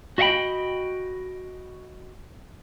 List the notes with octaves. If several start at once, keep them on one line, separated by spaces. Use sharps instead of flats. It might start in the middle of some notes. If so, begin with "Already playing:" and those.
F#4 D#5 E5 F#5 G5 B5